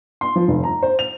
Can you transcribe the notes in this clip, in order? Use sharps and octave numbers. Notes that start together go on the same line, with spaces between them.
C6
F3
F1
A#5
C5
F7